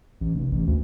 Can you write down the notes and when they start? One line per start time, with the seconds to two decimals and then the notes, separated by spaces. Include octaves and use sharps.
0.21 A1
0.35 F1
0.52 A1
0.67 D2